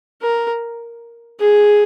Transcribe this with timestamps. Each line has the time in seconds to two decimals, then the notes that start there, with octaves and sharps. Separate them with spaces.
0.22 A#4
1.40 G#4